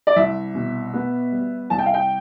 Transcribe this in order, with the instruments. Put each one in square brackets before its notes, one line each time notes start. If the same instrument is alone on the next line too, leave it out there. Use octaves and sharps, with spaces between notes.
[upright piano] D5
C2 E5
B2
B3
G3
C2 A5
G5
F5
G5